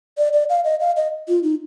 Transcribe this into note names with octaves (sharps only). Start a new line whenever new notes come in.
D5
D5
F5
D#5
F5
D#5
F4
D#4